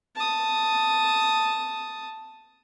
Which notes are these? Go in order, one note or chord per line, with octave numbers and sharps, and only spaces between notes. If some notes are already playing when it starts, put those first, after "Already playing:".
A5 D#6